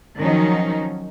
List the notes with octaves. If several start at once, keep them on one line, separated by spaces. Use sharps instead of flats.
D#3 F3 F#3 C#4 D#4